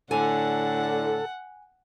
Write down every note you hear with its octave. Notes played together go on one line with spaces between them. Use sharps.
A2 D3 A4 F#5 G#5